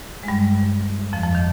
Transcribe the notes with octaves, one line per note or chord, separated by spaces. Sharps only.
G#3
G2 G3
F2 F3
F2 F3
D#3